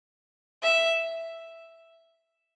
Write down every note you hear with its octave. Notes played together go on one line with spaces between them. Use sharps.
E5